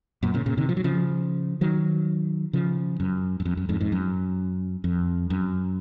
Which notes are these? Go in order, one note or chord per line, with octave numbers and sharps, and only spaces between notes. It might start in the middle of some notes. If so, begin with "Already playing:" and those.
F#2 A#2
A#2 C#3
A#2 C#3
C3 D#3
F3
F#3
C#3 F3
D#3 F#3
C#3 F3
F#2
F#2
F2
F#2
F2 G#2
F2 G#2
F#2
F2
F#2